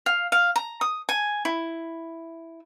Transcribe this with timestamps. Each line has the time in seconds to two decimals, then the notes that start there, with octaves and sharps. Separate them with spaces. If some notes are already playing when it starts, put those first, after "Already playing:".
0.06 F5
0.32 F5
0.56 A#5
0.81 D#6
1.09 G#5
1.45 E4